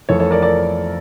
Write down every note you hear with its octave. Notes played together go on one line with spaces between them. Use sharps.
F2 E3 A3 A4 C#5
A4 C#5
A#4 D5
A#4 D5